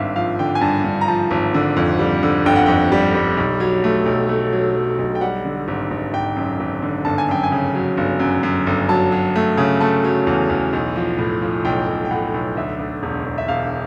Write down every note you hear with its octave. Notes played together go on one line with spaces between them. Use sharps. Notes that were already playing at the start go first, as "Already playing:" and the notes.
Already playing: G#1 G2 E5 F5
F3 F5
D3 G5
G#5
G2 A5
G2
A#5
F3 A5
G#1
D3
F2
G3
D3
G1 G5
F#5
F2 G5
G3
G3
B1
F#3
A3
B1
A3
F#3
F#3
B1
G5
G3 F#5
D3
G#1
G#1
G#1 G5
F#2
G#1
D3
G1 A5
G#5
F#2 G5
G#5
C#3
F#3
G1
F#2
F#2
G1
F#3 A5
F#3
A3
C#3
A3 A5
F#3
E2
E2
B1
F3
A2
F3
B1 G5
B1
G5
A2 F#5
B1
D2 E5
D2
E1
E1
E5
E1 F5